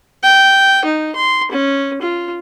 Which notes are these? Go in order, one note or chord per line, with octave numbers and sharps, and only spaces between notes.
G5
D#4
C6
C#4
F4